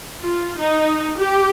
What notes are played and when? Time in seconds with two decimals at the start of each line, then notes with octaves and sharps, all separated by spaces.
0.20 F4
0.59 D#4
1.18 G4